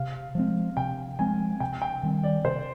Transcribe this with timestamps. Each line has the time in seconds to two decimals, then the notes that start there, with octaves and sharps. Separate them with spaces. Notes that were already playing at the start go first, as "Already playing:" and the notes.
Already playing: C3 F5
0.35 F3 G#3 C4
0.77 C3 G5
1.19 F3 G#3 C4 G#5
1.60 C3 G5
1.82 G5
2.03 D#3 G3 C4
2.24 D5
2.44 C3 C5